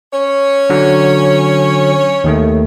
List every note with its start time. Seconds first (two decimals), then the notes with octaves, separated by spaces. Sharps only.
0.12 C#4 C#5
0.70 D3 F#3
2.24 D#2 D#3 A3